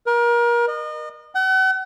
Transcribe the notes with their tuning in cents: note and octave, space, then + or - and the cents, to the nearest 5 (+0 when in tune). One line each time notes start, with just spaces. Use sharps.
A#4 +30
D#5 -30
F#5 +40